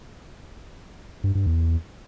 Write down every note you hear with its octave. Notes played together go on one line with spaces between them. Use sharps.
G2
G2
E2